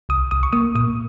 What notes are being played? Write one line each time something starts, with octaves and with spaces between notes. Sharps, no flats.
C2 D#6
C2 D#6
C#6
A#3 D#6
A#2 D#6